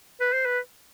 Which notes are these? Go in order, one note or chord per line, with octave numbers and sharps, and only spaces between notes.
B4
C5
B4